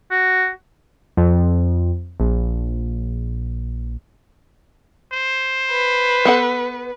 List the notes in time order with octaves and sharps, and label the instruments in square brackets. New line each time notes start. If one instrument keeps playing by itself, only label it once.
[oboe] F#4
[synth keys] F2
A#1
[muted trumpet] C5
[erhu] B4
[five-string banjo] B3 A4 F#5